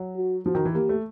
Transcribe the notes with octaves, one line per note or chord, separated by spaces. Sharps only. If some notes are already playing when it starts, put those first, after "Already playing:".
Already playing: F#3
F#4
F3 F#4
D#3
E3
A#3 G4
A3